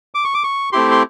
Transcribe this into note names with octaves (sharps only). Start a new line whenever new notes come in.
D6
C#6
D6
C#6
A3 C4 E4 G4 C6
C6